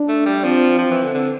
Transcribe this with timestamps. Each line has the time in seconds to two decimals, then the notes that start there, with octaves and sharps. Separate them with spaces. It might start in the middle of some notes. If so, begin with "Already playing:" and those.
Already playing: D4
0.08 A3
0.25 G3
0.43 F3 C4
0.79 F3
0.91 E3
1.03 D3
1.14 D3